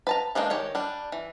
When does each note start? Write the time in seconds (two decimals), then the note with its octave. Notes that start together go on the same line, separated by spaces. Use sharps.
0.07 B4 A5 A#5
0.35 E3 G#3 A#3 D4 D#4
0.50 D#3 G4 C#5
0.75 G3 D4
1.12 E3